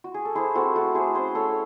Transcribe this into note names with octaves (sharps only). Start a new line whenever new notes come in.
F#4
G#4
A4
E4 G#4 C5
C4 F#4 A4
A3 F#4 A4
A3 G#4 C5
C#4 G#4 C5
A3 A4 C#5